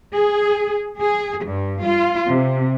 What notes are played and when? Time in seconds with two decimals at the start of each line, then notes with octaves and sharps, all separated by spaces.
0.13 G#4
1.00 G#4
1.46 G2
1.83 F4
2.31 C3